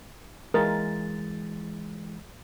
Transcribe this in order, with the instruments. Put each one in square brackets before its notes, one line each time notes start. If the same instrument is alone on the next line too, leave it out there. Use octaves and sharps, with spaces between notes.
[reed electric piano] E3 G#3 A6 [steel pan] A#4